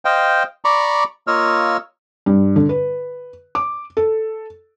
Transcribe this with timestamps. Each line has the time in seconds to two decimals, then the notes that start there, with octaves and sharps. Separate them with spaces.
0.05 C5 D#5 F5 G5
0.65 D5 A#5 B5 C#6 D6
1.27 A#3 F4 C#5 D#5 E6 F6
2.26 G2
2.56 D3
2.69 B4
3.55 D6
3.97 A4